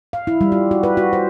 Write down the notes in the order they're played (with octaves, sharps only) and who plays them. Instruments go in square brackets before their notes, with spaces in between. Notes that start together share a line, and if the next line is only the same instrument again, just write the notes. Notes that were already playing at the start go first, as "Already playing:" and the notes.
[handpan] F5
E4
G3
F4
F#4
B4
F#4
C5